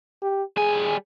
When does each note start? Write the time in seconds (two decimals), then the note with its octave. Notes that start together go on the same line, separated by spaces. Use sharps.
0.22 G4
0.57 G3 G#4 G#5